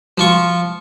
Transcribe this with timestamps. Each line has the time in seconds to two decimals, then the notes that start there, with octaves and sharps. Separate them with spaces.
0.18 F3 F4 C#6